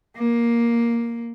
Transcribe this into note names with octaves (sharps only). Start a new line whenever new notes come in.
A#3